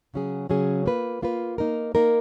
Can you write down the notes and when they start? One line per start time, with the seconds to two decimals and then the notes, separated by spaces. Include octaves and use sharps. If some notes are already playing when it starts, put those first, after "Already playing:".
0.14 C#3 F#3 C#4 G#4
0.50 C#3 F#3 C#4 G#4
0.86 A#3 F4 B4
1.22 A#3 F4 B4
1.58 A#3 D#4 A#4
1.95 A#3 D#4 A#4